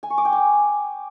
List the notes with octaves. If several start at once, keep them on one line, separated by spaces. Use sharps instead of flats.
G#5
C#6
D6
G5
G#5